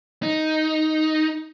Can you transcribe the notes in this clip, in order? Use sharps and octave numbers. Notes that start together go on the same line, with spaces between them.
D#4